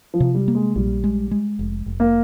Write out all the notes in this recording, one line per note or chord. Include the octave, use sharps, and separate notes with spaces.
F3
C3
G3
A#3
G#3
A#1 G3
G#3
G#3
F1
F1
A#3